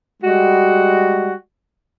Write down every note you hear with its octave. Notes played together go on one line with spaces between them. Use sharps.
G3 G#3 F#4